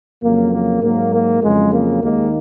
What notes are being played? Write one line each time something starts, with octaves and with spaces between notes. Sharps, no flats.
F2 C#3 F#3 A#3
A#3
G#2 F#3 A#3
A#3
F2 C#3 F#3 G#3
A#3
D#2 D#3 G#3 A#3